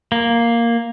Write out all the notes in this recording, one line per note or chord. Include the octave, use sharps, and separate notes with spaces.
A#3